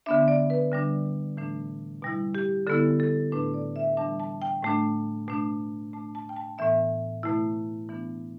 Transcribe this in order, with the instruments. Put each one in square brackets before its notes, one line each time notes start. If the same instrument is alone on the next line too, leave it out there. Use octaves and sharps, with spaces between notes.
[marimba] D3 B3 D4 E5
D5
B4
D3 G3 D4
A2 E3 A3 D4
B2 G3 E4
G4
D3 B3 E4 A4
A4
A2 A3 D4 B4
D5
E5
E3 G3 D4 A5
A5
G5
A2 A3 D4
B2 A3 D4
B2 A3 D4 A5
A5
G5
A5
A2 E3 B3 E5
B2 A3 E4
E3 B3 D4